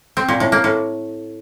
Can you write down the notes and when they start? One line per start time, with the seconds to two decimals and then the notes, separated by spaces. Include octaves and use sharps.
0.17 C4
0.28 A#2
0.40 A2
0.52 A#3
0.64 A2